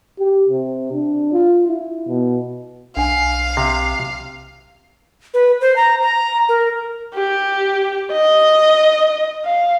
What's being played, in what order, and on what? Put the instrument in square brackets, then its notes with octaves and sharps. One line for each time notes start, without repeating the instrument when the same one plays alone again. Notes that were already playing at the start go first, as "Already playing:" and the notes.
[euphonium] G4
C3
D4
F4
E4
B2
[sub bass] B1 [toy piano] D4 F#5 G#5 [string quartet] F5
[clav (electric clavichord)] C3
[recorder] B4
C5
A#5
A#5
A#4
[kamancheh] G4
D#5
F5